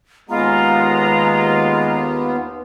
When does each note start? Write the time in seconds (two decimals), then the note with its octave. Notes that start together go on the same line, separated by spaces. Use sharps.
0.29 D#2 G#3 B3 F4 A#5